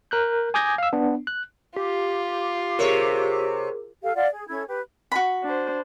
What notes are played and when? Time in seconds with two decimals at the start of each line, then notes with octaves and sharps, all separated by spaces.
0.11 A#4 F#6 G6
0.54 G#5 D6 D#6 G6 G#6 A#6
0.78 F5 E6
0.93 B3 D4
1.27 F#6
1.76 F4 G4
2.79 C3 G#4 A#4 C#5
4.03 G4 A4 F5
4.15 F4 D5 F5 F#5
4.31 G#4
4.49 C#4 E4 A4 G#6
4.67 G4 B4
5.12 F#4 B5
5.43 D4 C5